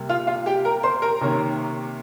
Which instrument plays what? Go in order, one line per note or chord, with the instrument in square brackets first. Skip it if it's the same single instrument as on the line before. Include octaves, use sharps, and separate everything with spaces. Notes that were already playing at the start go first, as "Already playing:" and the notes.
Already playing: [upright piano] C3 G3 A#3
F4 F5
F4 F5
G4 G5
A#4 A#5
C5 C6
A#4 A#5
C3 D#3 A#3 C#4